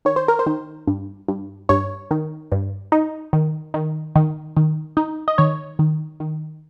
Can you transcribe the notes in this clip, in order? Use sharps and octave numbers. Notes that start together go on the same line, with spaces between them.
D#3 C#5
C5
A#4
C5
D#3
G2
G2
G2 C#5
D#3
G2
D#4
D#3
D#3
D#3
D#3
D#4
D#5
D#3 C#5
D#3
D#3